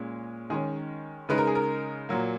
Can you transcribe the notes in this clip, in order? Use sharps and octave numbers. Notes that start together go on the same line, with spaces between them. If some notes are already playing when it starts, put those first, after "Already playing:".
Already playing: A#2 G#3 C#4
D#3 G#3 C#4 G#4
C#3 G#3 D#4 B4
A#4
G#4
A#4
A#2 F#3 A#3